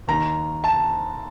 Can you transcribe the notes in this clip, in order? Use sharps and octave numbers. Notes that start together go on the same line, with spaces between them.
D#2 D#3 A#5
A5